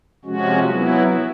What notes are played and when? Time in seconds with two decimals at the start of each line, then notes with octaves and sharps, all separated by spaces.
0.25 C3 F3 G#3 C#4 F#4
0.68 F#3 B3 E4